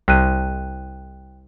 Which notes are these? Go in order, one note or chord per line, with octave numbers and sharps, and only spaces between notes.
C2 G5 F#6 D#7